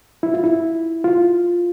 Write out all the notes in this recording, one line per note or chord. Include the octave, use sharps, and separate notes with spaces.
E4
F4
E4
F4